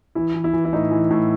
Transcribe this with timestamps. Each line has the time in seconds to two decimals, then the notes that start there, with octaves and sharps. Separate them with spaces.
0.15 E3 E4
0.34 E3
0.44 E4
0.53 E3
0.65 E4
0.73 A2 D#4
0.91 E3
1.10 A2